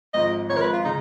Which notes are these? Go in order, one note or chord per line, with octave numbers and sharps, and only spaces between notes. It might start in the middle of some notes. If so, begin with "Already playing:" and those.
G#1 G#2 F3 D#5
G#1 G#2 F3 C#5
A#4
B4
F4
C#3 D#4